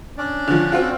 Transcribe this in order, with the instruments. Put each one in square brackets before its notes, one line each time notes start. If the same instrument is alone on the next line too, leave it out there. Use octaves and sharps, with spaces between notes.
[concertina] C#4 D4 D5
[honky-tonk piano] D3 F3
C4 F4 F#4